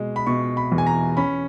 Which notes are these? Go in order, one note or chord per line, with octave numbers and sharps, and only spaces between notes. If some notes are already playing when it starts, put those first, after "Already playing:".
Already playing: B2 G#3
B5
B2 C#6
B5
E2
G#5
A#5
C#4 B5